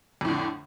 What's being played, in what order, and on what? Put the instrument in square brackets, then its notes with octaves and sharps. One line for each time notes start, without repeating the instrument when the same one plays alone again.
[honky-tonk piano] F2
A2
D3